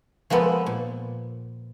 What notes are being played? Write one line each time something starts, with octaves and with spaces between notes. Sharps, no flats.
F3 G#3 A#3 B3 A4
A#2